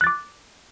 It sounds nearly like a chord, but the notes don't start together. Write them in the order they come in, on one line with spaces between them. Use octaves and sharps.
F#6 A6 D6